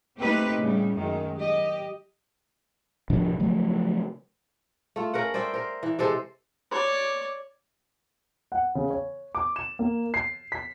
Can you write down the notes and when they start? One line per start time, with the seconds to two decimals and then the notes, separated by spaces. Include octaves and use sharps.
0.18 A3 A#3 C4 D#4 G4 B4
0.59 A2 C#3 G3
0.95 F#2 D#3 G#3
1.35 G4 D#5
3.10 D1 C3 F3 D4
3.40 C#3 F3 F#3 A3
4.96 A3 F4
5.14 C#4 A#4 B4 F#5
5.34 C5 D5 E5 G5
5.53 A#4 C5
5.83 E3
5.99 C3 G#3 A4 C5
6.71 C#5 D5
8.52 F#5
8.75 C#3
8.90 C#5
9.35 D6
9.56 E7
9.79 A#3
10.14 C7
10.52 B6